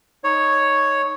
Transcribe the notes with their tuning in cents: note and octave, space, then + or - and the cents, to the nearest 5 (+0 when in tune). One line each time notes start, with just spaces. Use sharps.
D#4 +0 C#5 +0